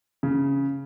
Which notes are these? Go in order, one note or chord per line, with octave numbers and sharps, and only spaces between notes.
C#3